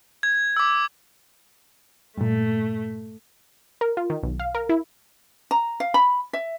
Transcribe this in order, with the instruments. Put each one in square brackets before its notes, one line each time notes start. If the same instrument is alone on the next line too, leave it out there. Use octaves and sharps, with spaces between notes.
[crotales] G#6
D6 E6
[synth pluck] G2 A#2 [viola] A3
[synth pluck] A#4
F4
D#3
B1
F5
A#4
E4
[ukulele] A#5
F5
B5
E5